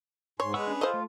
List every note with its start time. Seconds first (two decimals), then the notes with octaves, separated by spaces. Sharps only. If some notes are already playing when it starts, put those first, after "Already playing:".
0.40 G#2 C#5 G#5 C6
0.54 G#3 B3 G#4 F#5 C#6 E6
0.67 C#4 D4
0.81 F4 A4 C5 D#5
0.94 A3